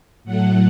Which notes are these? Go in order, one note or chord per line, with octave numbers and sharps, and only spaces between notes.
A2 F#3 A3 F#5